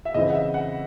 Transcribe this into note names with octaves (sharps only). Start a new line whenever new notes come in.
E5
C#3 E3 C4 D#5
F#5
E5
F#5